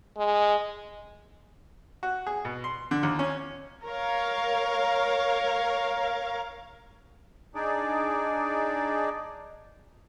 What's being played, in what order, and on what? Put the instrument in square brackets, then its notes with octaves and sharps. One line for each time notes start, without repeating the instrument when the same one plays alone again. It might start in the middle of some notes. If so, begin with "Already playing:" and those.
[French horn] G#3
[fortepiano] F#4
G#4
B2
C6
D3
D#2
C#4
[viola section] A#4 C#5 F5
[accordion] D4 D#4 G#4 D5